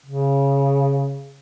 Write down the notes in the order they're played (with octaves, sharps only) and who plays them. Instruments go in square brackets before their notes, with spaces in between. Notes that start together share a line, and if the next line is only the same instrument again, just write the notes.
[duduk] C#3